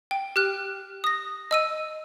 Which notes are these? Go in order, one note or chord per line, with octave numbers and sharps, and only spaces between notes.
G5
G4 F6 F#6
D#6 A#6
D#5 E6 D#7